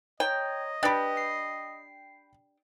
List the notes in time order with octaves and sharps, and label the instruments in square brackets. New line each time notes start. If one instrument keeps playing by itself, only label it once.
[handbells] C#5 A#5 [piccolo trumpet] D#5 [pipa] G5
[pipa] D4 G4 [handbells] B4 [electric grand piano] G5 B5
[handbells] C7